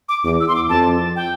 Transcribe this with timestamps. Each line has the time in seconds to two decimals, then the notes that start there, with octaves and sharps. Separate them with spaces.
0.09 D6
0.24 E2 D6
0.40 E6
0.48 C6
0.55 D6
0.69 F2 A5
1.16 G5